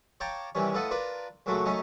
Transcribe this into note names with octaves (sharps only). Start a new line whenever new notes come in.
C#5 F5 G5 A5 A#5 D6
C3 D#3 E3 G3 C#4
A2 F4 A4 B4 D#5 F#5
D4 F4 A#4 B4 D5
C#2 A#2 F#3 A3 F#4
F#2 A3 C#4 D#4 D#5